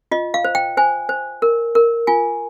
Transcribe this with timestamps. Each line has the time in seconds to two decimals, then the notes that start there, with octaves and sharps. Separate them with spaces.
0.12 F4 D#5
0.34 F5
0.44 C5
0.55 G5
0.77 C5 G#5
1.09 C5
1.42 A#4
1.75 A#4
2.07 F4 G#5